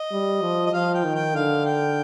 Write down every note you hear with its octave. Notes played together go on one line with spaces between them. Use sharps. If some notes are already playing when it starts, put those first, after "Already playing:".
Already playing: D#5
G3
F3
D#5
F3 F5
G5
D#3
G5
D3 F5
G5